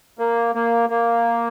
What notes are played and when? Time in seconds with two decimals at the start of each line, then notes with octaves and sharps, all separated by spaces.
0.19 A#3
0.55 A#3
0.90 A#3